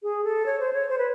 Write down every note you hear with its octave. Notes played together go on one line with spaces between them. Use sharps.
G#4
A4
C#5
C5
C#5
C5
B4